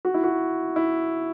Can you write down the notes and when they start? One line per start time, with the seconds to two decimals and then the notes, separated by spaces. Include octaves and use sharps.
0.05 F#4
0.14 E4
0.24 F#4
0.76 E4